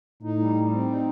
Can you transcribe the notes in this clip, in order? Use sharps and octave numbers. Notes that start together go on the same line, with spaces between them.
A2 D#4
G3
G3
C4
D#4